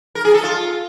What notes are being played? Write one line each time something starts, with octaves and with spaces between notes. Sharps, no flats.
A#4
G#4
A4
F4